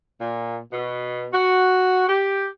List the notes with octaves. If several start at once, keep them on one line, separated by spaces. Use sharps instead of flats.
A#2
B2
F#4
G4